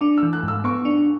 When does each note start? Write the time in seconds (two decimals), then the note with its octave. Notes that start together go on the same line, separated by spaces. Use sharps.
0.01 D4 D6
0.18 E6
0.23 E3
0.33 F#6
0.43 G#2 E6
0.64 B3 C#6
0.85 D4